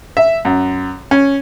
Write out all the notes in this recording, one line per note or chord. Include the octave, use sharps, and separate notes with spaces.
E5
F#2
C#4